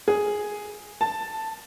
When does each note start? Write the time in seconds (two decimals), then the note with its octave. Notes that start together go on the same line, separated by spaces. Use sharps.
0.08 G#4
1.01 A5